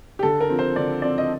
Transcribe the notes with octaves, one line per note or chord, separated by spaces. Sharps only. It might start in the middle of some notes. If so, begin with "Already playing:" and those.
G4
D3 A4
A#4
F3 C4
C5
D3 D5
F3 C4 D5
D#5